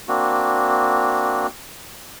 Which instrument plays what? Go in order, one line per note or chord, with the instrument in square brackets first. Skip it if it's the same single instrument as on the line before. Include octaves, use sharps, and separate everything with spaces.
[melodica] A#3 C4 D4 F#4